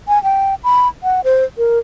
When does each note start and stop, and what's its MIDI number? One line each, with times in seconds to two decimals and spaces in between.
0.08 0.22 80
0.24 0.55 79
0.64 0.88 83
1.03 1.21 78
1.24 1.44 72
1.58 1.79 70